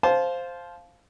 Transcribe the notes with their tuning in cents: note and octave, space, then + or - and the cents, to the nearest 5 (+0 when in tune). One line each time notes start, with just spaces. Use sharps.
C5 +0 F5 +0 A5 -25